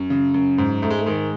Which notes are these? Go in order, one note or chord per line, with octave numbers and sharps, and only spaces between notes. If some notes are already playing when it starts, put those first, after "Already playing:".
Already playing: F#2
C#3
F#2
G#2
G#2 A3
G#3
A3
D#3 G#3